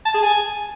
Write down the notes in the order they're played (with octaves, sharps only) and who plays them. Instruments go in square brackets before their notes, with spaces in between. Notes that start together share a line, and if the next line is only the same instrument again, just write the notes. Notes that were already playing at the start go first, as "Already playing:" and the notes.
[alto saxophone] A5
G#4
G#5